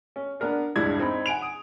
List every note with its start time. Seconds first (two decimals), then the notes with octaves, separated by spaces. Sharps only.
0.16 C#4
0.40 B3 D4 A#4 D5
0.76 E1 C#2 G2 D4 E4 G#6
0.99 C4 D#4 B5
1.26 F#5 G#5 D7 F7
1.42 D#6